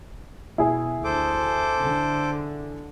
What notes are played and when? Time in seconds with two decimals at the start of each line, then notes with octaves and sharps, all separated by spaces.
0.58 B2 E4 G#4
1.04 D2 A4 C5 D6
1.79 D3